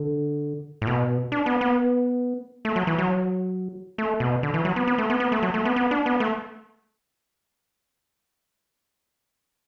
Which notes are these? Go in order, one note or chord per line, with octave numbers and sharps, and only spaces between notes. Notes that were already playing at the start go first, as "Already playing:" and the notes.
Already playing: D3
A2
B2
D4
B3
B3
A3
F#3
E3
F#3
A3
B2
D3
E3
F#3
B3
B3
A3
B3
B3
A3
F#3
A3
B3
B3
D4
B3
A3